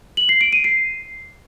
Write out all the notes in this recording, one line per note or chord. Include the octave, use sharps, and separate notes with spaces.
F#7
C7
D7
D#7
C7